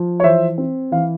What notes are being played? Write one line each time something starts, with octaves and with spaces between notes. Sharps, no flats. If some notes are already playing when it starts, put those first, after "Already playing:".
Already playing: F3
C#5
E3 C5 E5
C4
E3 F5